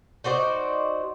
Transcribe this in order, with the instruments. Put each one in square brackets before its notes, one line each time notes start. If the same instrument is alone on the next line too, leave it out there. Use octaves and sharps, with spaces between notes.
[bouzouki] D#4 F#4 C5 D5